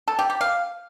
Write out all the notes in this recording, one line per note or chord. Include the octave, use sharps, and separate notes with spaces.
A4
G4
G4
F5